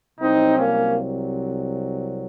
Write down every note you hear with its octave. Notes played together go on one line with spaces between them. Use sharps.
C2 C3 F#3 C4 D#4
A#3 C#4